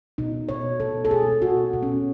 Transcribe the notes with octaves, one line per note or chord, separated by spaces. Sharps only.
B2 D#4
B2 C#5
B2 A4
A4
B2 G#4
B2 F#4
B2
C#4